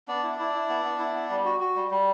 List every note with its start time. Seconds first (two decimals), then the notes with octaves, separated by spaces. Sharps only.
0.08 B3 D4 D5
0.23 E4
0.39 E4
0.54 E4
0.69 B3
0.85 B3
0.99 E4
1.14 B3
1.30 G3
1.45 F#4
1.60 F#4
1.76 G3
1.91 G3